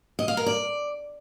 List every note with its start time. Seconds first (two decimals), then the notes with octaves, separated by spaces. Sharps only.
0.19 D#5
0.28 F5
0.37 A#4
0.46 D5